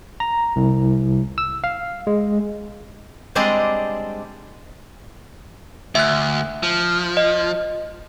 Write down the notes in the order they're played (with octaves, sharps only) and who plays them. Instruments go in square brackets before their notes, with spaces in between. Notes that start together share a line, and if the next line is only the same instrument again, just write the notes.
[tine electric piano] A#5
C2
E6
F5
G#3
[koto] G3 G#3 C4 D4 G#4 D#5
[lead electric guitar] D2 [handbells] E5 F#6
[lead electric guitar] F3
[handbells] D#5